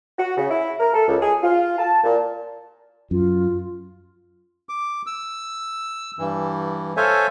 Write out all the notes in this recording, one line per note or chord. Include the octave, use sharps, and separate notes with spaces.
F#4
C#3
E4
A#4
A4
C#2
G#4
F4
A5
A#2
F#2 F4
D6
E6
G2 E3
A4 C5 C#5 E5 F5 G#5